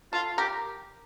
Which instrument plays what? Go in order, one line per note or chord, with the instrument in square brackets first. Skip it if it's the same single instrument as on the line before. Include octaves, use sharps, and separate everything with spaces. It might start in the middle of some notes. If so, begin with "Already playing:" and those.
[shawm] F4 [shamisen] A4
[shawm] G4 [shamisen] A#4